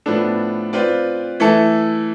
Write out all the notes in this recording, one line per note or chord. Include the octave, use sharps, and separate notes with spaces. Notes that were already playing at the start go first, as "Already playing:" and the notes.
A2 F3 B3 D4 A4
C4 F4 B4 D5
E3 A3 E4 A4